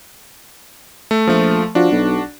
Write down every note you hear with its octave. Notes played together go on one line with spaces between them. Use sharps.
A3
A#1 F3 A3
F3 D4 F#4
B1